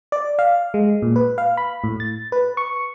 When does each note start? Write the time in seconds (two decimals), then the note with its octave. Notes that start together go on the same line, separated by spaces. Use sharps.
0.12 D5
0.39 F5
0.74 G#3
1.02 A#2
1.16 B4
1.38 F5
1.57 B5
1.84 A2
2.00 A6
2.32 B4
2.57 C#6